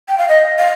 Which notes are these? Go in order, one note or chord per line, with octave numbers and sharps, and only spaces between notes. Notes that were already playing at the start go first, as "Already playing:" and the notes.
G5
F5
D#5
F5